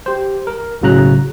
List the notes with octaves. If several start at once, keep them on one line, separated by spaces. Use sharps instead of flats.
G4 C5
A#4
B1 A2 C#3 F#3 A#5 F#6